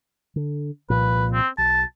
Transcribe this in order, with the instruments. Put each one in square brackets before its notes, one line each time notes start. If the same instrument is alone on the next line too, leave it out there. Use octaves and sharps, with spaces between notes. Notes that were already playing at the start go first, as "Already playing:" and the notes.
[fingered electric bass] D3
[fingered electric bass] C2 A#2 F3 [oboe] B4
[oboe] C4
[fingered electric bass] B1 [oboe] A5